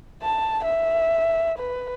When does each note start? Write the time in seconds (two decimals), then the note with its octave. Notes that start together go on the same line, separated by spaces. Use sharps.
0.23 A5
0.65 E5
1.58 B4